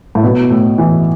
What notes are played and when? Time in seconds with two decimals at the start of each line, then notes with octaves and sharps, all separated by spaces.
0.15 A2
0.23 B2 B3
0.50 A2
0.78 E3